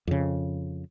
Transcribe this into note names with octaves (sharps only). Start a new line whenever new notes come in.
F2 C#3